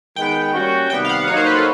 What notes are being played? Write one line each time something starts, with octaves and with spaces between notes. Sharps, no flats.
D#3 G#3 B3 G5
G3 A#3 C#4 F#4
C3 D#3 G3 B3 G5
F5
F#5
F#3 A#3 D#4 C#5
C5
B4
A4